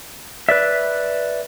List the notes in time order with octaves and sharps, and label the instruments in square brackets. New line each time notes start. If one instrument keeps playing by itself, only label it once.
[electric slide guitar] B4 D5 E5